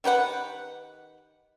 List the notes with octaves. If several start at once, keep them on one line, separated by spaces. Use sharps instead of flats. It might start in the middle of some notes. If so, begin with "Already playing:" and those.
D#3 G4 B4 F#5